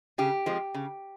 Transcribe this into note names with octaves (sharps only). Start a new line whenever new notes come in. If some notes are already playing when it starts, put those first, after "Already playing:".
C#3 G4
F3 G#3 C4
C#3